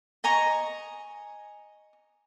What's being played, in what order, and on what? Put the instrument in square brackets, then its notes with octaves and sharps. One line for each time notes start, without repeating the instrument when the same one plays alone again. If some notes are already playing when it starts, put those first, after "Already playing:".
[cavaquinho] D#5 G#5 A#5 C#6